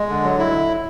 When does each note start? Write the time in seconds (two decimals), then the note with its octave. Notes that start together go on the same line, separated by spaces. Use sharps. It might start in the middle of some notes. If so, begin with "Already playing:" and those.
Already playing: G#3
0.09 D3
0.24 F#3
0.39 E4